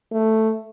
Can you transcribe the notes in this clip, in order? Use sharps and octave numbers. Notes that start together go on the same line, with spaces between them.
A3